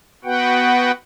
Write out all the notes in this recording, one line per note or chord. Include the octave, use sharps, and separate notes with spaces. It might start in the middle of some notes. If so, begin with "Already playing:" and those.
B3 F#4 B4 F#5 G5